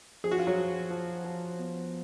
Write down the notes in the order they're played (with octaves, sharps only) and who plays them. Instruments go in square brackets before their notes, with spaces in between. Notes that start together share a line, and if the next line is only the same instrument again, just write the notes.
[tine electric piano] F3 [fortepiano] G#4
[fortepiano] F#4
F4
F#3 F#4
[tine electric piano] F3
F3
F3
B3